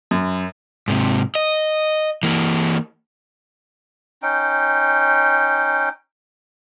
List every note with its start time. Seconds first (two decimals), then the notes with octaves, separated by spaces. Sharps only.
0.11 F#2
0.88 G#2 C3
1.35 D#5
2.23 E3 A#3
4.22 C#4 D#4 G5